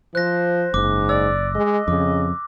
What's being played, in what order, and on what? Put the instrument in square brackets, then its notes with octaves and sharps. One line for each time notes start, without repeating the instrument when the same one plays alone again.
[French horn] F3 [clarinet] C5 [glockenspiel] F#6 A#6
[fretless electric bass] F#1 [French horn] G#2 [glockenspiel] D6
[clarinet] D5 [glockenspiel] E6
[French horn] G#3 [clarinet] D#5
[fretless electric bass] F2 [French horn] C#3 [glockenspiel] D6